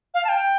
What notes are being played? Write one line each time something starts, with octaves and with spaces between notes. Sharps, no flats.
F5
A5
G5